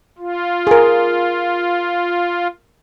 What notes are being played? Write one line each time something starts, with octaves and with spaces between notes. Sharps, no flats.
F4
G#4 A#4